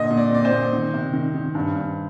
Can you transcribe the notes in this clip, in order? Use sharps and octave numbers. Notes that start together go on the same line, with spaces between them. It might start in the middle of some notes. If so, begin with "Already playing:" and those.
Already playing: A#2 D3 D#5
A#2
D5
C4 D5
C5
A#2
D#3
C3
D#3
D#3
G2
G2